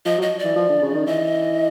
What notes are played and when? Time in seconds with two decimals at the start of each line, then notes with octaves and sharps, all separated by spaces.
0.05 F3 D#5
0.18 F#3
0.22 D#5
0.39 D5
0.44 E3
0.56 F3
0.69 D3
0.82 C#3
0.94 D#3
1.06 E3 D#5